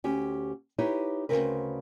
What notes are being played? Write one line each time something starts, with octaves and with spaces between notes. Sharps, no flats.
D2 C#4 G4
D#4 E4 G4 B4 C#5
D2 G#2 C#3 C4 A#4 B4